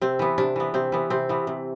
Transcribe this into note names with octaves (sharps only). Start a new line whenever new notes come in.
C3 C4
E3 B3
C3 D4
E3 B3
C3 C4
E3 B3
C3 C4
E3 B3
C3